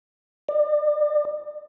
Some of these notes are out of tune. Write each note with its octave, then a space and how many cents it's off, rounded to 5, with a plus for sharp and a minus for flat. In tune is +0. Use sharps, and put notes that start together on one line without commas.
D5 +35